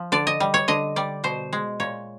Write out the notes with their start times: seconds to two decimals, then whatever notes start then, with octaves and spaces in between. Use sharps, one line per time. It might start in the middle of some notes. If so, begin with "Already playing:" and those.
Already playing: F3
0.12 D3 D5
0.27 D#5
0.40 G3
0.54 C#5
0.68 D3 D#5
0.96 G3 D5
1.24 B2 C5
1.53 G#3
1.80 A#2 C#5